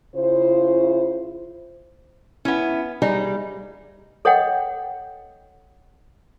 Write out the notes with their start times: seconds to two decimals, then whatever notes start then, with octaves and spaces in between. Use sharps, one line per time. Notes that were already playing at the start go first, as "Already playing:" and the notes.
0.16 C#3 E4 F4 C5
2.45 B3 C#4 E4
3.02 G3 D#4 G#4 D5
4.25 A4 C#5 D#5 F#5 G5